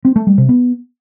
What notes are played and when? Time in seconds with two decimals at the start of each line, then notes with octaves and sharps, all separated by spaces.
0.05 C4
0.16 A3
0.27 G3
0.38 C3
0.49 B3